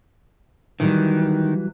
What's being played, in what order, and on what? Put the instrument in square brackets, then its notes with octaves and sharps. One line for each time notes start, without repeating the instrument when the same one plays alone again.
[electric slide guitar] D#3 [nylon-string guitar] E3 F#3 G3